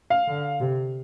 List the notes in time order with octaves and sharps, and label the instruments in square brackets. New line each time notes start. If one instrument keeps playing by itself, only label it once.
[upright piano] F5
[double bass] D3
C3